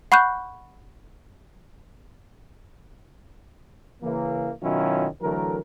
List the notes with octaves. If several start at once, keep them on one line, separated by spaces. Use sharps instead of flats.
F#5 B5 C#6 F#6 G6
C#3 E3 A#3
B2 D#3 F#3 C#4 E4 F4
D3 E3 F#3 A3 A#4